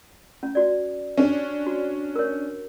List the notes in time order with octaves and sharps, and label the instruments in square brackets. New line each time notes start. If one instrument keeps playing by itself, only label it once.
[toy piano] C#4
F#4 D5
[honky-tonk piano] C#4 D4
[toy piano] F#4
A#4 C#5